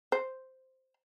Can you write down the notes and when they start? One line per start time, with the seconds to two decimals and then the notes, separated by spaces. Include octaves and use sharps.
0.12 C5